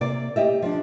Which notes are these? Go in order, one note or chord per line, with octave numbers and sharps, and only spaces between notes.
C3 A#3 D5
G4 D#5 E5
F3 D4